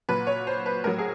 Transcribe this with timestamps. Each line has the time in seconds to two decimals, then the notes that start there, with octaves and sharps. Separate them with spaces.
0.09 A#2 F#3 B4
0.27 C#5
0.47 C5
0.66 B4
0.84 A2 F#3 A#4
0.98 G#4